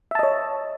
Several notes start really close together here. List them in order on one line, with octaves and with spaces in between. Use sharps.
E5 A5 D#5 C#5